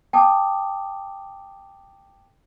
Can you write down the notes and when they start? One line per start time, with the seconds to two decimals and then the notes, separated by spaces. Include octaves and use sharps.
0.13 G5 A5 D6 D#6